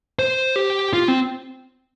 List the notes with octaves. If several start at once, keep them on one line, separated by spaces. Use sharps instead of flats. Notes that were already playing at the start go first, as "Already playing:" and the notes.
C5
G4
F4
C4